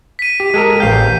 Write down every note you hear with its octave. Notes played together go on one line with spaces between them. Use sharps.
B6 D#7
G4
G#3 A4 A#4
A1 F5 G5 G6 C7